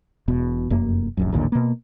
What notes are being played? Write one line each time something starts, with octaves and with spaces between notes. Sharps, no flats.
E1 B2
F1 F#2 A#3
D1 A#1 F#2
A1 D#2 A#2 D3
B2 A#3